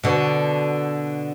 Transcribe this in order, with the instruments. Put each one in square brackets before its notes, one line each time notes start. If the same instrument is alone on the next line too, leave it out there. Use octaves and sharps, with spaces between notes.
[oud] B2 D3